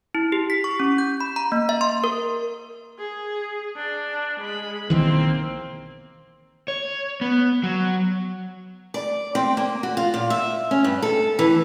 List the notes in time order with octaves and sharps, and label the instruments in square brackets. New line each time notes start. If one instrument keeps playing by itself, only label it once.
[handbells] E4
G4
B6
C#6
C#4
G6
B5
A#5
A#3
E5
C6
A#4
[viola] G#4
D4
G#3 B5
[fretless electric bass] B1 D#3 E3 [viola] A#3 C4
[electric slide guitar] C#5
B3
F#3
[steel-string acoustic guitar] D5
C4
A#3
F#4
F4
A#2
E5
C#4
G2
A4
E3